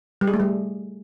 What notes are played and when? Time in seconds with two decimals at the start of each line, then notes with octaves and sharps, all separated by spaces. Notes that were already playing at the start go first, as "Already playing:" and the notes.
0.21 G3
0.27 G#4
0.34 A3
0.40 G3